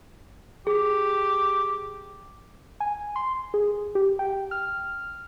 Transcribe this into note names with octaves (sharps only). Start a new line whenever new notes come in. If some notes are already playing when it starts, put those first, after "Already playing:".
G4 G#4
G#5
C6
G#4
G4
G5
F6